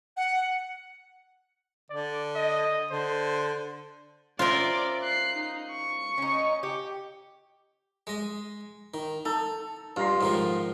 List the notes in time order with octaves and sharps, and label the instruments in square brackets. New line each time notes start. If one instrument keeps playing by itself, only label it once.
[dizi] F#5
[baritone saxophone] D3 [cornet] D5
[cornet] D#5
[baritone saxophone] D3 [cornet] C5
[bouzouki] C#4 C5 E5 [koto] F4 A#4 [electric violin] D5
[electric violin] F#6 C7
D#4
C#6
[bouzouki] C#4 D#4
G4
[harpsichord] G#3 D#5
D#3
[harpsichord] D#4 [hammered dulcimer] A4
[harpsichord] G2 [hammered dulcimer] F4 A#5 C6
[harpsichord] G#2 D#3 F3